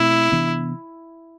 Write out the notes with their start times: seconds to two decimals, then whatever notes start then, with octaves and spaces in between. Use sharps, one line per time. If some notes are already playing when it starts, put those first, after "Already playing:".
Already playing: B2 A3 C4 E4
0.32 C3 E3 B3 D4